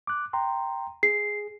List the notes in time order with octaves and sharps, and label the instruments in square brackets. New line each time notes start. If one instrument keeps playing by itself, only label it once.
[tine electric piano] D6 F#6
G5 A#5 C6
[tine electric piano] G#4 [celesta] C7